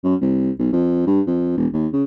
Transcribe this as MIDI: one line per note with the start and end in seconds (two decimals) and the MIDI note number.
0.04 0.15 42
0.21 0.51 36
0.59 0.68 35
0.73 1.04 41
1.07 1.21 43
1.27 1.54 41
1.57 1.67 28
1.73 1.88 39
1.93 2.04 49